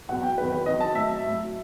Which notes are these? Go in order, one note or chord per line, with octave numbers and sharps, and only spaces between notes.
E2 B2 F#3 F#5
G5
E2 D#3 F#3 B4
B4
E2 D#3 F#3 D#5
A5
A2 F#3 E5
A2 F#3